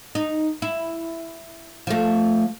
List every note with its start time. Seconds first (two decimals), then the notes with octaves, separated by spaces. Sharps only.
0.15 D#4
0.62 E4
1.87 F3 A3